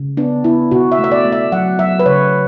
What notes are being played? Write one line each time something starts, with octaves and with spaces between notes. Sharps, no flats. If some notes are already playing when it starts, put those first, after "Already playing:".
Already playing: C#3
B3 D4
B3 E4
B2 F#4
E5
A3
E5
D5
A3
E5
F#3 F#5
F#3 E5
B4
C#3 C#5